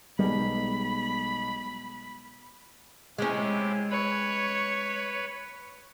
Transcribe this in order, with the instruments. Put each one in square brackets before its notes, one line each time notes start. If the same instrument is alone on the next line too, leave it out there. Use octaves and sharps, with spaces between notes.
[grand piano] B1 [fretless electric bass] G3 G#3 B3 [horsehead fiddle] B5
[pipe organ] C3 E4 G4 [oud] G#3 C#4
[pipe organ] B4 B5 [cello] C#5